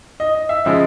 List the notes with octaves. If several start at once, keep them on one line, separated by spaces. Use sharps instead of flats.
D#5
D#5
E5
C#3 F3 G#3 E5